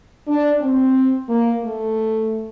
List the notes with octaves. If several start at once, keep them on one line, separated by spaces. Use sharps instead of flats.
D4
C4
A#3
A3